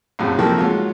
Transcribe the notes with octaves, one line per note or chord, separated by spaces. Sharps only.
A#1 F#2 A2 C3
C3 D#3 F3 G3 A3 A#3
G#2 F#3 F4